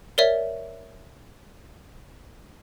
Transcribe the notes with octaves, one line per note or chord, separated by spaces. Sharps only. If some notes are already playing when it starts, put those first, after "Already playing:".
A#4 C#5 D5 E5